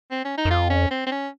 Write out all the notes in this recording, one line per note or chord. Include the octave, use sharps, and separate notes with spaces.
C4
C#4
D#4
F#2
F2 F4
C#4
C4
C4
C#4